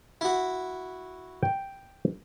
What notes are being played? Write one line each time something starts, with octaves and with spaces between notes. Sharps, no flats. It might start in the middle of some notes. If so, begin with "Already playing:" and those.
E4 F#4
G5